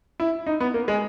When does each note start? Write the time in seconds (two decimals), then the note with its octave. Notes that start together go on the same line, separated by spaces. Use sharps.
0.20 E4
0.47 D#4
0.60 B3
0.74 A#3
0.88 G#3